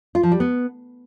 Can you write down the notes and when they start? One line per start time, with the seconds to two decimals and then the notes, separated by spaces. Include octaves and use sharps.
0.15 F4
0.23 F3
0.32 G3
0.40 B3